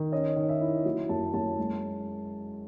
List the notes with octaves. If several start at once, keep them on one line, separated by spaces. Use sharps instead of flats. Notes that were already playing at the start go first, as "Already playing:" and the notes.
Already playing: D#3
C#4 D#5
D#3
E5
E4
F#3
F#2 A5
F#2 A5
G#3